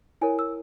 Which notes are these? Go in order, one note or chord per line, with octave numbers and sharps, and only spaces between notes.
E4 A#4 C#5 G#5
E6